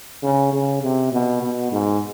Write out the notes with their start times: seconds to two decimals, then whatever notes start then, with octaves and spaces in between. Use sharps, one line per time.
0.23 C#3
0.53 C#3
0.82 C3
1.12 B2
1.42 B2
1.72 G#2